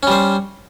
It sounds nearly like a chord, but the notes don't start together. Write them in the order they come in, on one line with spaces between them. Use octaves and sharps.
C#4 G3 C5